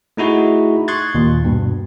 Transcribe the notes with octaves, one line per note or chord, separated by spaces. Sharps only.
A3 D#4 E4 F#4 G#4
C6 C#6 D#6 F#6 G#6 A6
D#2 A#2
G2 B2